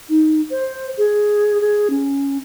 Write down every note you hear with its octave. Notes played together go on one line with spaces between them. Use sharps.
D#4
C5
G#4
G#4
C#4